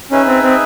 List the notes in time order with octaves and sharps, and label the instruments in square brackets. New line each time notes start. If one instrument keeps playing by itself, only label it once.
[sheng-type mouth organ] C#4 [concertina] D#4 G#4 B4 E5
[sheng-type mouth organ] C4
C4